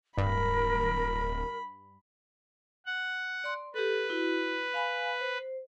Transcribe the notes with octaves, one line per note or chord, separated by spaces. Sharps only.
D1 G2 A#4 B5
F#5
D5 C6
G4 A4 B4
E4 F#4
F5 G#5 B5
C5